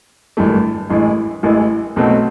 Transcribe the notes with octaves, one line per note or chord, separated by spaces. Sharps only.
G#1 G2 E3 A3
A1 A2 E3 G#3
A1 A2 E3 G#3
B1 B2 F#3 A3 C4